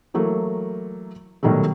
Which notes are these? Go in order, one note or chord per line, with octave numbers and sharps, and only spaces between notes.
E3 F#3 A3 A#3
B2 D#3 F#3 G3 A3